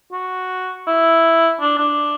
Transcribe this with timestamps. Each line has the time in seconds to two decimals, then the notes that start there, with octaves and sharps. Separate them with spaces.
0.12 F#4
0.87 E4
1.61 D4
1.78 D4